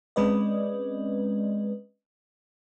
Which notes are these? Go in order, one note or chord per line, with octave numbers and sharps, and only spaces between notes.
G#3 C4 C#4 B4 D5 D#5